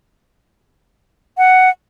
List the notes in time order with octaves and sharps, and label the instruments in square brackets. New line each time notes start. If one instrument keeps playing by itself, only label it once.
[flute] F#5